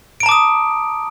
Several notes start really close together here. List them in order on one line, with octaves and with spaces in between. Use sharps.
D7 A#5 A5 D6 D#6